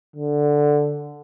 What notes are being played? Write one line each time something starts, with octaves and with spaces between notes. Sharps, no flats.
D3